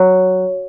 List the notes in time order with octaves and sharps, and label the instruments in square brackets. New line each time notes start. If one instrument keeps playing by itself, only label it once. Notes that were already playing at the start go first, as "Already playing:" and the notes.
Already playing: [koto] F#3